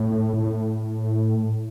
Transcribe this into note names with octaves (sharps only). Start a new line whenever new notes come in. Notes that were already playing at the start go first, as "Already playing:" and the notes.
Already playing: A2
A2